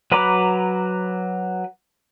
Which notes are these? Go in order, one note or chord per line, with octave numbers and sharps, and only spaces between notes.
F#3 B4 A#5 B5 D6